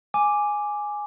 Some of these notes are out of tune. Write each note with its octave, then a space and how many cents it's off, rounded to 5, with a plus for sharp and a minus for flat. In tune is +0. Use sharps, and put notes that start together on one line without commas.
G#5 +0 D6 +0